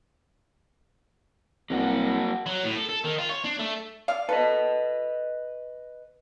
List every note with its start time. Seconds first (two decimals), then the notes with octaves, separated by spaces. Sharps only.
1.70 C2 F#3 A#3 F#4
2.46 F#3
2.64 A2
2.76 A4
2.89 A4
3.04 D#3
3.18 F4
3.30 C#5
3.44 D4
3.59 A3
4.08 D5 F5
4.29 A4 B4 D#5